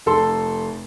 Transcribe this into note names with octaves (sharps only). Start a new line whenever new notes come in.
F1 A4 C6